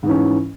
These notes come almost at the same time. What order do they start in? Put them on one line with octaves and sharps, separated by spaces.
G#2 E3 C#4